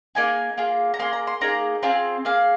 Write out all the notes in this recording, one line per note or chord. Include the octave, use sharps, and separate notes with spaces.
A#3 D#4 G#4 G#5
A#3 F4 G#4
A#5
A#3 G#4 C6
A#5
C6
A#3 D#4 G#4 A#5
C4 F4 G#4
A#3 G#4 F5